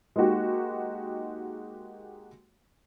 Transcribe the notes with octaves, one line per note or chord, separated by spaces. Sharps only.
G#3 A#3 D#4 F#4 G4